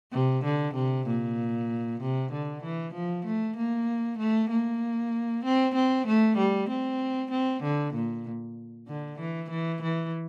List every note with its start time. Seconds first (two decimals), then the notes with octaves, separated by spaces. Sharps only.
0.12 C3
0.44 D3
0.75 C3
1.07 A#2
2.01 C3
2.32 D3
2.63 E3
2.94 F3
3.25 A3
3.57 A#3
4.19 A3
4.50 A#3
5.45 C4
5.75 C4
6.07 A3
6.37 G3
6.70 C4
7.31 C4
7.63 D3
7.95 A#2
8.88 D3
9.19 E3
9.50 E3
9.82 E3